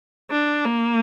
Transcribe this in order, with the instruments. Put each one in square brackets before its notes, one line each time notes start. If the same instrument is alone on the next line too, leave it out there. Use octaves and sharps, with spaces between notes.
[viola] D4
A#3